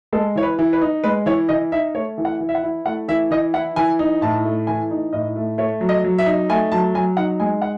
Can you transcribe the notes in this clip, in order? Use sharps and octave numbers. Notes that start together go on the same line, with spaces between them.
G#3 A4
E3 C#5
B4
E3
B4
D#4
G#3 B4
E3 C#5
E3 D#5
D#4 E5
A3 C#5
E3
F#5
E3
E5
F#5
E4
A3 F#5
E3 E5
E3 D#5
E4 F#5
E3 G#5
D#4
A2 A5
A3
E3 G#5
D#4
A2 D#5
A3
A3 C#5
F#3
D#5
F#3
E5
D#4
A3 G#5
F#3 A5
F#3 G#5
D#4 F#5
G#3 G#5
F#5